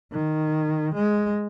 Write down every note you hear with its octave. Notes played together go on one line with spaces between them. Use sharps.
D#3
G#3